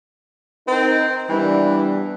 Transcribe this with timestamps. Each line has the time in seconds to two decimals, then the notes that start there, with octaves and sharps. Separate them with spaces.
0.68 C4 D#4 A#4
1.29 E3 G3 B3 D4